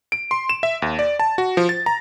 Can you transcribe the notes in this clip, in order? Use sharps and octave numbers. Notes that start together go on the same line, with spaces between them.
D7
C6
E7
E5
D#2
D5
A5
F#4
F3
A6
A#5